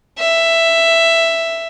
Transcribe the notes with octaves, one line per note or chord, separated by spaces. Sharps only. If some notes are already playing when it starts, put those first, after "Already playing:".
E5